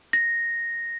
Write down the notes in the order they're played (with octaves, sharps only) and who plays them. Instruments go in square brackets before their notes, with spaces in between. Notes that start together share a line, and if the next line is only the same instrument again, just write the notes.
[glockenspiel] A#6